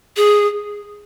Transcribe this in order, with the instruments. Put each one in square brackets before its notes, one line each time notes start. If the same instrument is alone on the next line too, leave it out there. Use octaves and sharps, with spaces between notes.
[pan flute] G#4